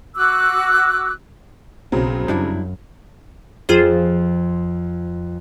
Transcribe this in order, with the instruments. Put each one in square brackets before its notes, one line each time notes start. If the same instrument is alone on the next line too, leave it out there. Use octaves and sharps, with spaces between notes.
[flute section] F#4 D6 E6 F#6
[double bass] B1 [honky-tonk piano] C#3 F#3 C4
[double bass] F#2 [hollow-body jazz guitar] G3 D4 E4
[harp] F2 [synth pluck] F4 G#4 C5